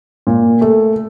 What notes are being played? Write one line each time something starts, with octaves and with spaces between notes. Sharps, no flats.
A#2
A3